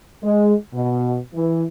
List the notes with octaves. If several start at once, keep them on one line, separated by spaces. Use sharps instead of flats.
G#3
B2
E3